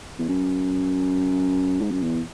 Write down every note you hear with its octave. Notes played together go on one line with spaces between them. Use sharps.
E2
F#2
G#2
F#2
E2